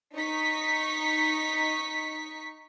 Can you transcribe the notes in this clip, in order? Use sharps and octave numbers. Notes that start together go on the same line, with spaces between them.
D#4 C#6 B6